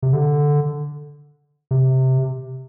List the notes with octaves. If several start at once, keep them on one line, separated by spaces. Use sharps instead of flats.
C3
D3
C3